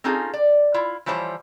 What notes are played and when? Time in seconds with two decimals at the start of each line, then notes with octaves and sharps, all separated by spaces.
0.04 C4 C#4 D#4 F4 G#4 A4
0.33 D5
0.74 E4 F4
1.06 E3 F3 G3 E4 C5 C#5